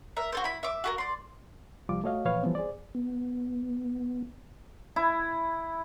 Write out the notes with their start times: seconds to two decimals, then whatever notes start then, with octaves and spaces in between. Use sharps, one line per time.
0.17 A#4 E5
0.32 F#4 A4 C5
0.44 E4 B5
0.63 E5 D6
0.84 F#4 G4 A#4
0.98 D5 C6
1.89 C2 F3 G3 F4 D6
2.04 A3 F#4 C#5 D#5 F5
2.25 A#2 E3 F3 B4 C#5 F5
2.43 E3 F3 G3 B3 C4
2.55 G#4 C5 D5
2.95 B3
4.96 E4